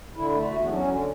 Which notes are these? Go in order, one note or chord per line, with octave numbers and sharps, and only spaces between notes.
D3 E4
A3
E2 F#4
B3
F#3 D4
C#4
D3